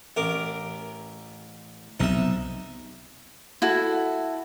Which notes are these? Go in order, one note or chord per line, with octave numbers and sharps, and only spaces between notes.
A1 A#4 D6
B1 C3 D#4 E5
E4 F#4 A4